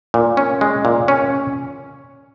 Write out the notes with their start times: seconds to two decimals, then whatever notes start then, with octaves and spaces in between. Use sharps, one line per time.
0.14 A#2
0.37 C#4
0.61 G#3
0.85 A#2
1.08 C#4